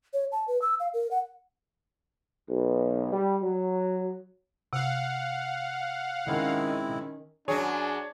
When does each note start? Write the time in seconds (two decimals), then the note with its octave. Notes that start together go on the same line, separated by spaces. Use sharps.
0.13 C#5
0.32 A5
0.48 B4
0.62 E6
0.80 F5
0.94 A#4
1.11 F#5
2.49 B1
3.13 G3
3.42 F#3
4.73 C3 F5 F#5
6.27 D#3 G#3 C4 C#4 E4
7.48 F#2 F#3 D4 G#4 C#5